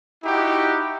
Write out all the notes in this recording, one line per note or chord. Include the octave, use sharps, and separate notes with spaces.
D#4 E4 F#4 G4